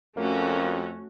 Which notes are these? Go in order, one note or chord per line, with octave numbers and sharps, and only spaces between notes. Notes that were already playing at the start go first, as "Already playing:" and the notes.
F2 A3 A#3 C#4 F#4